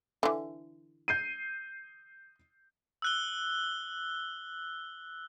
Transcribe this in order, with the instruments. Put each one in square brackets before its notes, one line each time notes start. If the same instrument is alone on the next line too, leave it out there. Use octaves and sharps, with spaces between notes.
[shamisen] D3 E3
[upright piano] G6 C7 D#7
[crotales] E6 F#6 G7